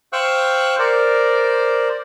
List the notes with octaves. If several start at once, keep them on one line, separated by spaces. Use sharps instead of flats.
C5 F5 G5 C#6 E6 F#6
A#4 C5 D5